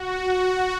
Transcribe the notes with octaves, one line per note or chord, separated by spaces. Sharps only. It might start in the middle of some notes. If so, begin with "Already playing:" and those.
Already playing: F#4
F#4